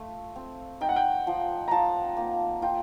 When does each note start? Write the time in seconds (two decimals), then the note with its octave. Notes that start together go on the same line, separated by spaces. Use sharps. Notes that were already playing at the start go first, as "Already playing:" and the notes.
Already playing: A3 F4
0.36 C4
0.81 D#4 G5
0.89 F#5
0.96 G5
1.27 F3
1.68 A#5
1.71 F3 A5
2.17 A#3
2.62 F4 G5